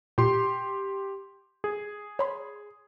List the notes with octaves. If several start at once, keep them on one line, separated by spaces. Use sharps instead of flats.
A#2 G4 C6
G#4
C#5 B5 C6